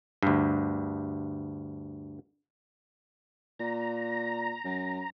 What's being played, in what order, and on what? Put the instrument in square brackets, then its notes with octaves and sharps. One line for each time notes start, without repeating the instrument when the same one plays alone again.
[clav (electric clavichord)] D2 G2
[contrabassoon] A#2 [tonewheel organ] A#5
[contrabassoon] F#2